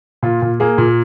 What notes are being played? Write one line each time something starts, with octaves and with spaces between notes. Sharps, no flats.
A#2 F4
A#2
A#3 G#4
A#2